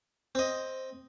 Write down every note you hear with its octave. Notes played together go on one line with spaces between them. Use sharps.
C4 D#5